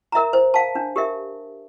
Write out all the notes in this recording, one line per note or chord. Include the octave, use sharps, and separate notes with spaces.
A#4 E5 A#5
C5
F5 A5
D4
G4 A#4 E5